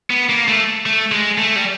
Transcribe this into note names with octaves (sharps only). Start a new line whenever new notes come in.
B3
A#3
A3
A3
G#3
A3
G3